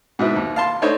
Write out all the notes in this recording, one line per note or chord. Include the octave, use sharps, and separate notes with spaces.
G#2 B2 E4
D#2
F5 A5 C6
A3 D4 D#4 C5 C#5